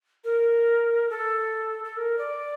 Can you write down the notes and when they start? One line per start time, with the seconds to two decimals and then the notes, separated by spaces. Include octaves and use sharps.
0.24 A#4
1.10 A4
1.84 A4
1.97 A#4
2.18 D5